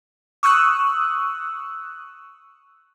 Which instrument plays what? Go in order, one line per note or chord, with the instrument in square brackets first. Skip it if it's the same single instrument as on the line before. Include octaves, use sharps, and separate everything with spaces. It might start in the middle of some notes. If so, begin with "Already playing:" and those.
[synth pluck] C#6 D#6 E6 F#6